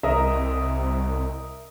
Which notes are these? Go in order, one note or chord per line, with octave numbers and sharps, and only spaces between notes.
C2 A#4 D#5 E5